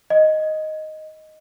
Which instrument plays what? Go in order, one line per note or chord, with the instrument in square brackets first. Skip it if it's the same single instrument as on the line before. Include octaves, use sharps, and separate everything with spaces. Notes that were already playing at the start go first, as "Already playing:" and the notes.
[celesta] D#5